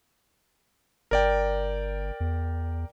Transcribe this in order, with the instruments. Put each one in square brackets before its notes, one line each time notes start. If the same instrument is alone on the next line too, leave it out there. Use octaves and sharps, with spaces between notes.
[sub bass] G1 [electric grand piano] A#4 D5 G5
[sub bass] E2